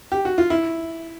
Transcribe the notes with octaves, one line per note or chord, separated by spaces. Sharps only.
G4
F#4
F4
E4